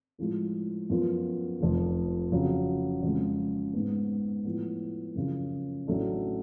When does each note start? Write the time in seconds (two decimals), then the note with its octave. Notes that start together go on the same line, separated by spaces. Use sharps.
0.18 A2 F3 G#3
0.90 F#2 F3 B3 F4
1.61 F1 F2 F3
2.32 F2 C#3 F#3
3.02 F2 C#3 G#3
3.73 G#2 G#3 B3
4.45 A2 F3 B3
5.16 F#2 C#3 F3
5.87 A1 A2 F#3 A3 D4